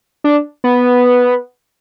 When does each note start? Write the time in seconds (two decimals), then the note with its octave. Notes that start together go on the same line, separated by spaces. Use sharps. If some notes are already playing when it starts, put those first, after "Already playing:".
0.24 D4
0.64 B3